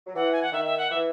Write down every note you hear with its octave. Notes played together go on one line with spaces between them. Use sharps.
F#3
E3 F#5
G#5
F#5
D#3 E5
E5
F#5
E3 E5